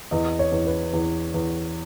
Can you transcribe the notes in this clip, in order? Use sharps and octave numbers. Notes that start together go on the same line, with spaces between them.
E2 D#5
C#5
E2
B4
E2
E2